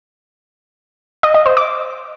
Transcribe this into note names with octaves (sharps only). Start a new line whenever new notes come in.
D#5
D#5
C5
D6